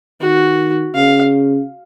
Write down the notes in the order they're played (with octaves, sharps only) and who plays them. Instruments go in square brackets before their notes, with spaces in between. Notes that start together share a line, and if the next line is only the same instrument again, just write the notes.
[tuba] D#3 [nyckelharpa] F#4
[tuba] C#3 [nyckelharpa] F5